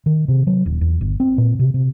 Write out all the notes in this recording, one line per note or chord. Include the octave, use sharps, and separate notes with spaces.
D#3
C3
F#3
D#1
E2
G1
C4
A#2
C3
C3